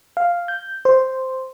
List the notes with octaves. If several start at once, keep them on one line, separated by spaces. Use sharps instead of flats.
F5
G6
C5